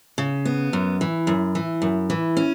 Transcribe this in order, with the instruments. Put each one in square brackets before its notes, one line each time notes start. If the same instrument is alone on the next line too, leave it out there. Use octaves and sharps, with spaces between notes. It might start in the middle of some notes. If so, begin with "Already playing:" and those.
[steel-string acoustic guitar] C#3
B3
F#2
E3
F#2
E3
F#2
E3
C#4